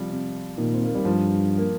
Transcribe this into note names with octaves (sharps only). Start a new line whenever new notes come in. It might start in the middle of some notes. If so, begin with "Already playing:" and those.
Already playing: C3 F3 G3
C3
A#2 D#3
C4
A#3
G3
G2 F3
A#3